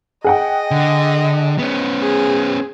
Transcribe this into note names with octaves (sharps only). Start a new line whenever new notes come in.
G#4 D#5 F#5 G5
D3
B3 C#4
G#4